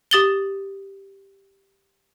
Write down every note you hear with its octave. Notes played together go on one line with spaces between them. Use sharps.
G4 D#6 A6 F#7 G7